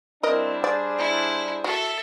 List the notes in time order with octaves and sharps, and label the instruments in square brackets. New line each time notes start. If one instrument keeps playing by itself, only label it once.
[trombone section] G3 D4 [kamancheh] C4 E4 [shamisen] A#4 D#5
[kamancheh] G#4 C5 [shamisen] D5
[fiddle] E4
[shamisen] F#4 [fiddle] A4 E5